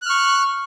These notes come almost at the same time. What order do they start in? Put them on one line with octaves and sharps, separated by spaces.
F#6 F6 C#6